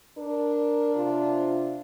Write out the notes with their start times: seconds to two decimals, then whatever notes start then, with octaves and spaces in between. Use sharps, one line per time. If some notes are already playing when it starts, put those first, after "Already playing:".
0.18 D4 A#4
0.95 C3 F4